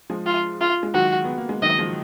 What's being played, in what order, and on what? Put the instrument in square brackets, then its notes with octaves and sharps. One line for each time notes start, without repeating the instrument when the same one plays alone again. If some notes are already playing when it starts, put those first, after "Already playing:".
[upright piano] F3 G#3
[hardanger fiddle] F4
F4
[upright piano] G#3
[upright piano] D#3 F#3 [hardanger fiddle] F#4
[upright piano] B3
A#3
G#3
[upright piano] D#3 F#3 [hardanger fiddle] D#5
[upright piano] F3 G#3